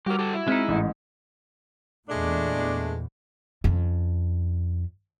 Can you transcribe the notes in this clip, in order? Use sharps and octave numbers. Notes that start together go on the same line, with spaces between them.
G3 F#4 G4 A#4 D6
G4 A4
E4
G#3 C4 D#4 F6 B6
A1 G#2 E3
E2 A#2 G#3 A3 D4
F2 C#4